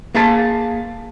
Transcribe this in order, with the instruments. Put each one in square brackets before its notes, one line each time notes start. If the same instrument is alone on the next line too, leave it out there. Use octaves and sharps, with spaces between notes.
[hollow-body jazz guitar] A#3 G#4 F5 A5